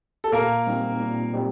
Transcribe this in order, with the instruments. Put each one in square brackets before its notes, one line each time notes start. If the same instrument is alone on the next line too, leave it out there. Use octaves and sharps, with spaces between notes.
[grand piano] A4
[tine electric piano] A#2 [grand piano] A#3 A#4
[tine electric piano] G3 C4 D#4
A#2
G3 C4 D#4